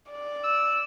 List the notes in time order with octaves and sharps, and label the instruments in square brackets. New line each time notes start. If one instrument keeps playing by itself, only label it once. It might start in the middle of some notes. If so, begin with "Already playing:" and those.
[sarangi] D5
[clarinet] E6